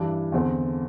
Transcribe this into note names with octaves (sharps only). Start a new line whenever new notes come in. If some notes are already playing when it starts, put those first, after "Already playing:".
Already playing: G2 E3 G3 D4
E2 D3 C4